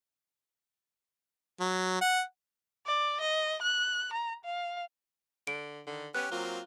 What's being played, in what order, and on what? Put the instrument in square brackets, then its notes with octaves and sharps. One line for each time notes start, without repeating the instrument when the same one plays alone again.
[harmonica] F#3
F#5
[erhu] D5
D#5
F#6
A#5
F5
[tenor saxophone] D3 [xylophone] D7
[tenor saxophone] D3 [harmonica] D#3
[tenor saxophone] B3 [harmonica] C#4 G4 [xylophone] F#6
[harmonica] F#3 A#3 C4 [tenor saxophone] F4